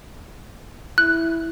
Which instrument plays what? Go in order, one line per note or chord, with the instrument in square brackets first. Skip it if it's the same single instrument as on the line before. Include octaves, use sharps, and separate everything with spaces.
[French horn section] E4 [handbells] F#6